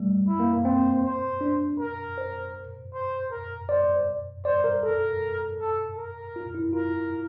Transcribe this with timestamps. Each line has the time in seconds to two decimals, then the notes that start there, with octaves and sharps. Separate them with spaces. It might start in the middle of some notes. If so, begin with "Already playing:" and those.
Already playing: G3 A3
0.27 E4
0.40 A#3
0.53 A#3
0.65 C4 C5
1.03 C5
1.41 D4
1.79 A#4
2.18 C5
2.94 C5
3.31 A#4
3.69 C5 D5
4.45 C5 D5
4.64 A#4
4.83 A4 A#4
5.59 A4
5.97 A#4
6.36 F4
6.55 E4
6.73 F4 A#4